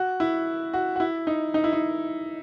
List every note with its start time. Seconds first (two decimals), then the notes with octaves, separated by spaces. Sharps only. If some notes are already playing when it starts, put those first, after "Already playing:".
Already playing: F#4
0.20 E4
0.73 F#4
0.96 F#4
1.00 E4
1.27 D#4
1.54 D#4
1.64 E4
1.73 D#4